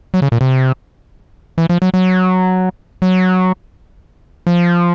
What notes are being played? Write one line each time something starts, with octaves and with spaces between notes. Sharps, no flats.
F#3
C#3
A#2
C3
E3
F3
F#3
F#3
F#3
F3